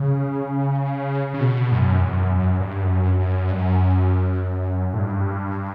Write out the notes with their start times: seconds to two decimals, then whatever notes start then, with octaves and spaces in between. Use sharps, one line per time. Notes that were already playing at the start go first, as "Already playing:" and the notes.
Already playing: C#3
1.34 C#3
1.40 B2
1.72 G2
1.77 F#2
2.01 E2
2.12 F#2
2.36 F#2
2.60 G2
2.84 F#2
3.19 F#2
3.51 G2
3.56 F#2
4.93 A2
4.99 G2